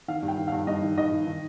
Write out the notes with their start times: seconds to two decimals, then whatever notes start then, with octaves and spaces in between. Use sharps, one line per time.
0.08 D#3 F5
0.22 G2
0.28 G5
0.38 D#3
0.48 G2 F5
0.67 G2 D#5
0.82 D#3
0.97 D#3 D#5
1.12 D#3
1.27 D#3